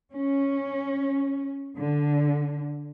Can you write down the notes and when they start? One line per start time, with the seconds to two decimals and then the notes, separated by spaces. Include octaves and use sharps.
0.11 C#4
1.77 D3